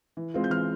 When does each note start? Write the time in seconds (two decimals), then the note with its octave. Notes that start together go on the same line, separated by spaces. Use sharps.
0.17 E3
0.34 G#3 C4 F4
0.44 G6
0.50 E3 F6